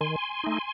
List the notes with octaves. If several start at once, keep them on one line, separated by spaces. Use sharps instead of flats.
D#3 G#5 C6
A3 D#4